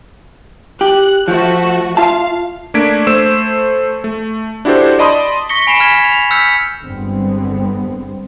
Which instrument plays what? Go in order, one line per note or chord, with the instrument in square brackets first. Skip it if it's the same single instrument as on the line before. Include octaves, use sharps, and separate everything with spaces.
[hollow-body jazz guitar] G4 [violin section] F#6
[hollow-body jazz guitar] F3 [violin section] A3 F#4
[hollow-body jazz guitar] F4 E5 A5 [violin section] F5
[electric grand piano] A3 A#3 D4 G#6 B6 D7
A3 C5 E6 E7
A3
D4 E4 F#4 G4 A4 C5
D5 D#5 A5 B5 C6 D#6
[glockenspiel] C#6 A#6 B6 C#7 G7
G#5 B5 C7 E7
F6 G#6 B6
F7
E6 F6 G6 B6 C#7
[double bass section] G1 D3 G3 G#3 B3 C4